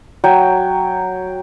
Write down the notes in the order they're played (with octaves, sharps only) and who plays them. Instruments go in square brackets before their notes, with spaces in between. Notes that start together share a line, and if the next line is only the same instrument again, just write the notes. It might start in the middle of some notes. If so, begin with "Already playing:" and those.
[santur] F#3 G5